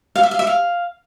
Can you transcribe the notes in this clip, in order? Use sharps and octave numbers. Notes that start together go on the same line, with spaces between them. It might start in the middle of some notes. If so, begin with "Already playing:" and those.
F5
E5
F5
E5
F5